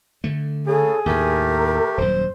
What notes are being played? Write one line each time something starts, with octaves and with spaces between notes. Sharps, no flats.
D3 A3
C#3 G#4 A4
D#2 A2 A3 G4 A#4
D#1 F#2 C5